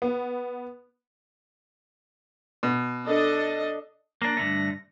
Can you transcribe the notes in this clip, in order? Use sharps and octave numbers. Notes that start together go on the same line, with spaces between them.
B3
B2
D4 A4 D#5
A#3 D4 A#6
G2 D3 A3